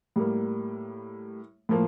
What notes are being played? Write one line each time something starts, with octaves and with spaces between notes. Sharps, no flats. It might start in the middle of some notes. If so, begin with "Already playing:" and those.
A2 G3 A#3
A2 F3 A#3